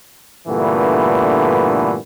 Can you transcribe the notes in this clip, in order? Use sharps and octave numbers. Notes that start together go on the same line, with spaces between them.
G2 A#2 D3 E3 A3 B3